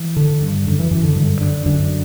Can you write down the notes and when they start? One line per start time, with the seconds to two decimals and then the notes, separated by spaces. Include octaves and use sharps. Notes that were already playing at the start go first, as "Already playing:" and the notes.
Already playing: E3
0.17 D3
0.41 G2
0.66 F#2 D3
0.79 E3
0.91 F#2 E3
1.03 D3
1.16 G2 D3
1.41 D3
1.66 F#2 D3